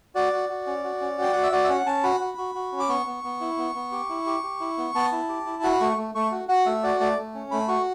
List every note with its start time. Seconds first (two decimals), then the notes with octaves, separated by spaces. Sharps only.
0.15 F#4 D5
0.33 F#4
0.49 F#4
0.67 C#4
0.84 F#4
1.01 C#4
1.18 F#4 G5
1.33 F#4 F#5
1.43 E5
1.52 F#4 D5
1.64 E5
1.69 C#4 F#5
1.86 C#4 A5
2.04 F#4 B5
2.20 F#4
2.38 F#4
2.55 F#4
2.72 C#4
2.80 D6
2.89 B3 C#6
3.06 B3
3.24 B3
3.41 E4
3.58 B3
3.75 B3
3.92 G4
4.09 E4
4.26 G4
4.43 G4
4.60 E4
4.78 B3
4.95 B3 A5
5.12 E4
5.29 G4
5.46 E4
5.63 F#4 B5
5.80 A3 C#6
5.97 A3
6.15 A3 C#6
6.32 F#4
6.49 F#4 F#5
6.66 A3 E5
6.83 F#4 D5
7.00 A3 D5
7.18 A3
7.35 C#4
7.51 A3 B5
7.68 F#4 C#6